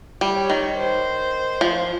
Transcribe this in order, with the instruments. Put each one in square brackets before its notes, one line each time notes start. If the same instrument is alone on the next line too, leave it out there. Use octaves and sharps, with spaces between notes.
[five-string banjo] G3
[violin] C#5
[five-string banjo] D#3
[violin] C5
[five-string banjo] F3